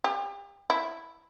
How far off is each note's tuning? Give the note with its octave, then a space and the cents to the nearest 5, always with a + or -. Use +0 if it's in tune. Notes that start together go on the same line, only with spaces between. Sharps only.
G4 +35
E4 +0